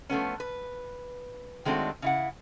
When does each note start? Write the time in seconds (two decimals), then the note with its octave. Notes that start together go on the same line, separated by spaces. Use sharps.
0.09 F3 A3 B3 C#4
0.40 B4
1.65 D#3 G#3 A3 C4 D4 F#4
2.02 C#3 E4 F#5